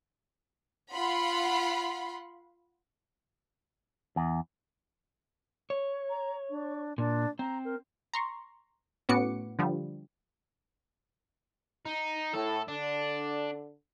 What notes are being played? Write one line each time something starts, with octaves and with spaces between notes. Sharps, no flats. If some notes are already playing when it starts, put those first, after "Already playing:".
F4 F#5 B5 C6
E2
C#5
A#5
D4
A#2 D4
C4 A#5
A#4
A#5 C6 C#6
A2 B3 C#4 F#4 D6 C#7
D3 F3 G3
D#4
A2 A4
D3 D4